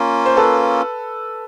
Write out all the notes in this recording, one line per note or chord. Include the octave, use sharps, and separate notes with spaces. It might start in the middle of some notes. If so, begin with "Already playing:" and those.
Already playing: A#3 C#4 F4
C5
A4 B4